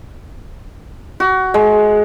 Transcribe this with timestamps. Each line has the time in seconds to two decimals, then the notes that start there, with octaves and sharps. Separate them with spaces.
1.20 F#4
1.54 G#3